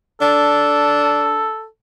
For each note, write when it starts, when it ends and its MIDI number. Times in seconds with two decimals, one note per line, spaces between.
0.21 1.50 62
0.21 1.66 69